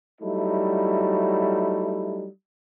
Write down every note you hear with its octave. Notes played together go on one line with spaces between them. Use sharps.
F#3 G3 A3 D#4 E4